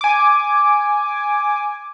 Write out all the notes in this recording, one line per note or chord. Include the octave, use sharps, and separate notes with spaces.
G#5 D6